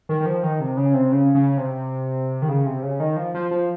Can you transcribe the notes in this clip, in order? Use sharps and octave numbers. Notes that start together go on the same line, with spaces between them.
D#3
D#3
F3
D#3
C3
C#3
C3
C#3
C#3
C3
D#3
C#3
C3
C#3
D#3
F3
F3
F3